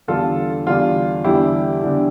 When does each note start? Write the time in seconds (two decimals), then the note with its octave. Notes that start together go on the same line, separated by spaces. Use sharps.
0.08 E2 D3 G3 D4 F4 A4
0.67 E2 D3 G3 D4 F4
1.24 E2 D3 G3 D4 E4 G4
1.83 E2 D3 G3 D4